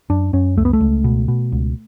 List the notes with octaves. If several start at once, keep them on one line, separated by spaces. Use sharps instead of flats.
F#2 D4
F#2 C#4
C#2 A3
B3
A3
C#2
B2
B2
C#2